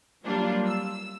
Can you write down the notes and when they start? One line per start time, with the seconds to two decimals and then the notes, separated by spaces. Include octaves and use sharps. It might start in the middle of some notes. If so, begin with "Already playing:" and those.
0.25 F#3 G3 A#3 D4 F4
0.66 E6